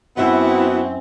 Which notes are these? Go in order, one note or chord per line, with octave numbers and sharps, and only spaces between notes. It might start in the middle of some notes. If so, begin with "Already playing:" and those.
F#2 B3 C4 E4 F#4 E5 G5